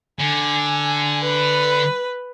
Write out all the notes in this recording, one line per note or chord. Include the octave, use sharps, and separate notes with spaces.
D3 G#5
B4